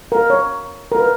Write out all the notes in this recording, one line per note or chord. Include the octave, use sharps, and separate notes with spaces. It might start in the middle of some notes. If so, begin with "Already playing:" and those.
A#4
C#5
A#4
B4